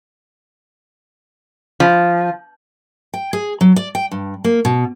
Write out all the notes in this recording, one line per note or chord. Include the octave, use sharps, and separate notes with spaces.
F3
G5
G#4
F#3
D5
G5
G2
A#3
B2